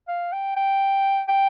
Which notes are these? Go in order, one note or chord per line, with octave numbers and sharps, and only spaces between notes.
F5
G5
G5
G5